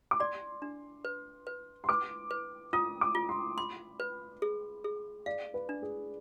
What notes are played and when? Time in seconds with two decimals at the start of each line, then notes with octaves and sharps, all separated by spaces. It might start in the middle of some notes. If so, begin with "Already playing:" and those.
0.11 D6
0.20 D5 C6
0.62 D4
1.05 B4
1.47 B4
1.84 C6
1.89 B4 D6
2.31 B4
2.73 F4 D#6
3.01 D6
3.15 F4
3.29 C6
3.57 B5 C6
4.00 B4
4.42 G#4
4.84 G#4
5.26 D5 F5
5.54 B4
5.69 D4
5.82 G#4